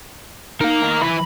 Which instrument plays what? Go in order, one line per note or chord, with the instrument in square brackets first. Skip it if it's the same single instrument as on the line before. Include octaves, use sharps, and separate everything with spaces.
[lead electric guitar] D#4 [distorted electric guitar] A#4 F5
[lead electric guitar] D#3
[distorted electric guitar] E3 B4 [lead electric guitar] B5